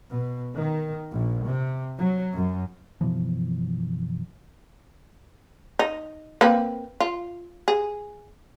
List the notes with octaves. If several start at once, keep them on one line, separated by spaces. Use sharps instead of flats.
B2
D#3
A#1
C3
F#3
F#2
F#1 B2 E3 F3
D#4
A#3 C4 B4
F4
G#4